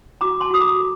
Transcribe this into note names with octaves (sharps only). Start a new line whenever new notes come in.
F#4 A#5 D6
A5 C6
F#4 D#6
A#5 D6
A4